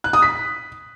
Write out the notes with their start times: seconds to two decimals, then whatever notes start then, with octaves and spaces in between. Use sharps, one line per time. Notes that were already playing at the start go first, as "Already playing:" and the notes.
0.04 F#6
0.13 D#6
0.22 B6